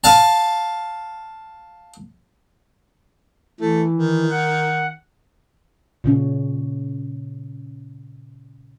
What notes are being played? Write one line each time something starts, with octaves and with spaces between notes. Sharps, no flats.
F5 A5
E3 A3
D#3
F#5
A#2 C#3 C#4